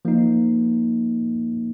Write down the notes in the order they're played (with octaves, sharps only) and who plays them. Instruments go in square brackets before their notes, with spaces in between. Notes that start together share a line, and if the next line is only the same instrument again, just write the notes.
[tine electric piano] F3 A#3 D#4